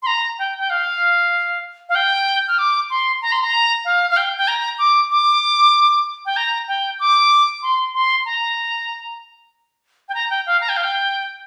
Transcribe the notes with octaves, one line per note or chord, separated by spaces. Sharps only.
C6
A#5
G5
G5
F5
F5
G5
F6
D6
C6
A#5
C6
A#5
F5
F5
G5
G5
A#5
D6
D6
G5
A#5
G5
D6
C6
C6
A#5
G5
A#5
G5
F5
A#5
G5
F5
G5